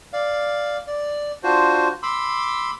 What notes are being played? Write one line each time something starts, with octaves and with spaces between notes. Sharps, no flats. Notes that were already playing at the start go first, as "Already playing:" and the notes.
D5 F5
D5
D4 F4 F#4 C5
B5 C6 D6 E6